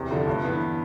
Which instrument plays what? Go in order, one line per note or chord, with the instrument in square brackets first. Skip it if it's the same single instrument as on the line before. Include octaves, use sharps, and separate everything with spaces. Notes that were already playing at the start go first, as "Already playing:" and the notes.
Already playing: [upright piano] E2 [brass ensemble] C3
[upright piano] D3 F3 A3 D4
G2
E3 B3